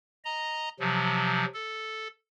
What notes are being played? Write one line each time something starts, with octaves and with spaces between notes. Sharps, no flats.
D#5 A#5
C3 F3 F#3
A4